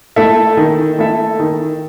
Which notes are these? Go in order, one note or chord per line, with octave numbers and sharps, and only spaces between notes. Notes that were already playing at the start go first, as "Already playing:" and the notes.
A3 E4 A4 E5
D#3
A3 E4 A4 E5
D#3